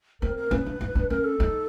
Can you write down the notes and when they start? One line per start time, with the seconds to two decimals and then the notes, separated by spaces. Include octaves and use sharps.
0.21 C4 A#4
0.36 A#4
0.51 C#4 B4
0.66 D4
0.81 D#4
0.95 D4
1.10 C#4 A#4
1.24 A4
1.40 D#4